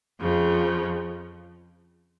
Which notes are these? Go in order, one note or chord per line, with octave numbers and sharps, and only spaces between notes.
F2 C#3 F3